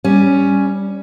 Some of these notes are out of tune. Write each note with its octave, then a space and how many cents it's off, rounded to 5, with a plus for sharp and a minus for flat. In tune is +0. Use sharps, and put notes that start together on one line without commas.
G3 +0 C#4 +0